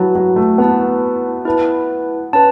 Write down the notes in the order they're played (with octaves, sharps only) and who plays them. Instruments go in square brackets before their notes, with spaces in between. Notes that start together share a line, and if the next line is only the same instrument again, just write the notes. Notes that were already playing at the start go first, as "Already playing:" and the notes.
Already playing: [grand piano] F#3 [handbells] E4 B4 A5
[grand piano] F#3
A3
[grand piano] B3 [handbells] E4 B4 A5
[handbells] E4 B4 A5
[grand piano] C#4 [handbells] B4 A5